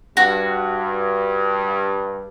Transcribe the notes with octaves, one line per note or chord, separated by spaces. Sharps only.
G2 F#4